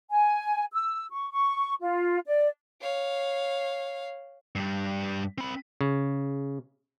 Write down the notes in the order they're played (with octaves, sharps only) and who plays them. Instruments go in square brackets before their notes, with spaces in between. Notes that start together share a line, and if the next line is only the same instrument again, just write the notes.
[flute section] G#5
E6
C#6
C#6
F4
D5
[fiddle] C#5 F5
[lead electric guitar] G2 G3
C4 B5
[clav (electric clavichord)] C#3